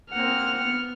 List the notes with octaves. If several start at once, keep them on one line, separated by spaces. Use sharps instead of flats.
A#3 C4 F#5 F6
B3